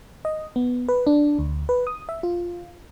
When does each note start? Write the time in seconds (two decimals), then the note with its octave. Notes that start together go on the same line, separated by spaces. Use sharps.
0.25 D#5
0.56 B3
0.88 B4
1.07 D4
1.39 D2
1.69 B4
1.87 D#6
2.09 E5
2.23 F4